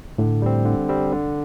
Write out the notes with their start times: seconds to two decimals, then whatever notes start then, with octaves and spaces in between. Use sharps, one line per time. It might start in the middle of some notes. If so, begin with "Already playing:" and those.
0.18 A2 D3
0.42 G3 C4
0.65 D3
0.89 G3 C4
1.12 D3